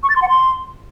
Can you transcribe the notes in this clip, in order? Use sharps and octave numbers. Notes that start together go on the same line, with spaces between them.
C#6
A6
C6
F#5
C6